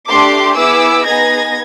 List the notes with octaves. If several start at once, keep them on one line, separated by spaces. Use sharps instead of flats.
A3 D4 G4 C6 D6
B3 E4 G#4 D6 E6
B3 D#4 G#4 G#6 A#6